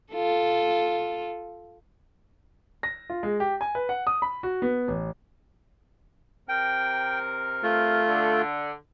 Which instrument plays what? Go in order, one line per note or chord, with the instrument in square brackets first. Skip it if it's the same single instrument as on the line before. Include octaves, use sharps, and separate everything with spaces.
[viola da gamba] F4 A4
[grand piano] A#6
F4
G#3
G4
G#5
B4
F#5
D#6
B5
F#4
B3
A1
[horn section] C3 A#4 [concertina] G5
[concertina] A3 F4
[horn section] D3